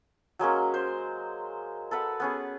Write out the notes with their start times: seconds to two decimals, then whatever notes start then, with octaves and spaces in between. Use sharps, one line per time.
0.39 F#3 G#3 A#3 C#4
0.74 C5
1.91 A4 B4 F#5 B5
2.20 B3 C#4 G#4